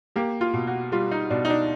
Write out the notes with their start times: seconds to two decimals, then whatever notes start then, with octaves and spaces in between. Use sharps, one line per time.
0.16 A#3 G4
0.41 F4
0.53 B2
0.67 F#4
0.92 G3 F4
1.11 D#4
1.30 B2 D4
1.45 D#4
1.50 D4